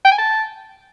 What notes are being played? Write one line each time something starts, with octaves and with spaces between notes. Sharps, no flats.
G5
G#5
A5